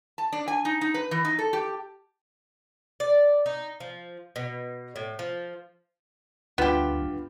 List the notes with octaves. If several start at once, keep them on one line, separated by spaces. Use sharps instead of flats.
A5
D4
G#5
D#4
D#4
B4
E3
D#4
A4
G4
D5
D#4
F3
B2
A2
F3
D2 G2 B3 F4 G4 E7